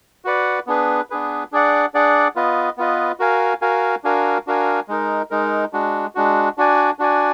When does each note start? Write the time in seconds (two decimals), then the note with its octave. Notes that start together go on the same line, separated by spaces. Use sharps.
0.25 F#4 B4 D5 F#5
0.67 B3 D4 G#4 B4
1.10 B3 D4 G#4 B4
1.52 D4 G#4 D5 F#5
1.94 D4 G#4 D5 F#5
2.36 B3 F4 B4 D#5
2.77 B3 F4 B4 D#5
3.20 F#4 A#4 F5 G#5
3.62 F#4 A#4 F5 G#5
4.04 D4 F#4 A#4 F5 G#5
4.47 D4 F#4 A#4 F5 G#5
4.88 G#3 D#4 A#4
5.31 G#3 D#4 A#4
5.73 G#3 D4 F#4
6.15 G#3 D4 F#4
6.58 D4 F#4 D5 G#5
6.99 D4 F#4 D5 G#5